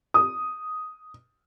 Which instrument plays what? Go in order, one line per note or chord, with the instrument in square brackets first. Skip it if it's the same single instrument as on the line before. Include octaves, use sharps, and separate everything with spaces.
[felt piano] D#6